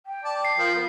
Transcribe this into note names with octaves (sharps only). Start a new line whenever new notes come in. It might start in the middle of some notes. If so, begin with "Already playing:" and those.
G5
D5 A5
C7
F3 F4 A#4 G5
F3 B3 A#4